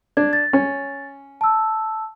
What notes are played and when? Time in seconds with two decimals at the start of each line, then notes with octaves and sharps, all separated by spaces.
0.17 D4 G#6
0.33 A6
0.53 C#4
1.41 A5 E6